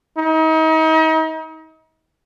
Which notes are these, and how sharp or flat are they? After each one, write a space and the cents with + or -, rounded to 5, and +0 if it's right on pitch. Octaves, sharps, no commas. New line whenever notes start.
D#4 +35